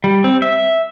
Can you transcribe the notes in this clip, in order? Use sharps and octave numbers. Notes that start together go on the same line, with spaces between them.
G3
C4
E5